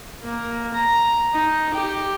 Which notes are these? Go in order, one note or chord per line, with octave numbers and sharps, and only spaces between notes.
A#3
A#5
D#4
G4